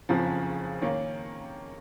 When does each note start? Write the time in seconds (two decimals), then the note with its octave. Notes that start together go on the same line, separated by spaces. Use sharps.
0.09 F#1 F2 C#3 F3
0.82 D#3 A#3 C#4